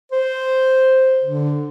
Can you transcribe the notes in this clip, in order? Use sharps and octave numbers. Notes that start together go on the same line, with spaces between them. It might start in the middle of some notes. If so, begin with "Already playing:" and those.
C5
D3